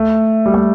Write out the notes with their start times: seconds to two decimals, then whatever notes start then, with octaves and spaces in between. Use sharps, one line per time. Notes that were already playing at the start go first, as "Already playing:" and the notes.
Already playing: A3
0.46 G3
0.54 A3